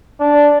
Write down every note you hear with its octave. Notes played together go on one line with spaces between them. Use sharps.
D4